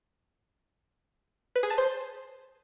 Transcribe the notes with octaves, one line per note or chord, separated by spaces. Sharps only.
B4
G#4
A5
C5